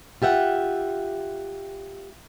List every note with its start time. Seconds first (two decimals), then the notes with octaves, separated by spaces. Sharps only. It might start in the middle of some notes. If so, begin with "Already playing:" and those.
0.22 F4 G4 E5 F#5